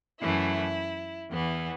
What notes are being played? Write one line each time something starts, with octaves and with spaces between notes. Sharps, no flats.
F#2 E3 A3 E4
E2 E3 B3